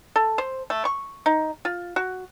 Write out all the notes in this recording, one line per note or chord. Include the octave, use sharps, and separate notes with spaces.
A4
C5
A3
C#6
D#4
F4
F#4